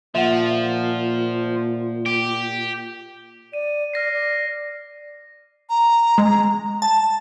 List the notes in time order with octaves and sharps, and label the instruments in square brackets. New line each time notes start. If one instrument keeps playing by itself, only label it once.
[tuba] A#2 [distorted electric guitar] F3 [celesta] E5 F#5
[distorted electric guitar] G4
[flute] D5 [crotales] D#7
[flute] D5 [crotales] F6 A#6 C7
[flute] D5
[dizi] A#5
[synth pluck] G#3
[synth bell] A5